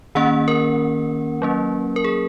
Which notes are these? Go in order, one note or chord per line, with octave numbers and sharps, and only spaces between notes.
D#3 A#3 C#4 F#5
A#4
F#3 A#3 C#4
A#4
G#4